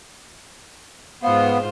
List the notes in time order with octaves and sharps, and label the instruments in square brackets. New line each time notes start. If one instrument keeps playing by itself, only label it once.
[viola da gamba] G#2 F4 C5 [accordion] B3 [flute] F5